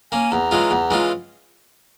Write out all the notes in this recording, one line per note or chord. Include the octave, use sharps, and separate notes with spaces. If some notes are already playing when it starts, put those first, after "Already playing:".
A#3 C#4 G#5
E2 A#5
E3 G#3 C#4 F4
E2
E3 G#3 C#4 F4